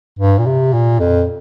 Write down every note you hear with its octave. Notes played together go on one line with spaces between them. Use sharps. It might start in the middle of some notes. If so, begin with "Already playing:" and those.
G2
A#2
C3
A#2
F2